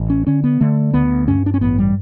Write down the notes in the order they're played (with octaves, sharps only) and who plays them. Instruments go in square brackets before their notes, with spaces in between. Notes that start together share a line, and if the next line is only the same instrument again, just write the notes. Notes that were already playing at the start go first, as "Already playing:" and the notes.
Already playing: [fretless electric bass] A1
C#4
D3 C#4
B3
D3 A3
D2 B3
G2 C#4
D4
C#4
A1 B3
G3